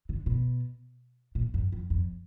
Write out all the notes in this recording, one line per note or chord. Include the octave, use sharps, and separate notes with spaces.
D3
B2
A#2
F#2
F2
F2